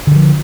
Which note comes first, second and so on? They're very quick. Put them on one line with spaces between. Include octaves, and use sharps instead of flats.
D3 D#3 F3